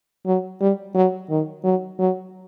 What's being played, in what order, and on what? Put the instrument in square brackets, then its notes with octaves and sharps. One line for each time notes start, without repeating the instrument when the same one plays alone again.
[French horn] F#3
G3
F#3
D#3
F#3
F#3